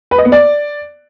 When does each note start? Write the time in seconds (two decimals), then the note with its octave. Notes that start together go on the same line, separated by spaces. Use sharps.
0.11 B4
0.18 D#5
0.25 B3
0.32 D5